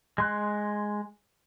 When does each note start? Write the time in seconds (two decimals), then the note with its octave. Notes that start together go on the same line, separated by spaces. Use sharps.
0.18 G#3 C6 F#6